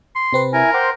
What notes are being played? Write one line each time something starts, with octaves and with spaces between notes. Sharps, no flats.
C6
C3 C4 B4
E4 A#4 G#5
C5 F#5 G5 C6 D6